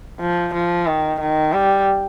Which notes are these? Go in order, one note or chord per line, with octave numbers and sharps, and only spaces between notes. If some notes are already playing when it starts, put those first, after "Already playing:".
F3
F3
D#3
D#3
G3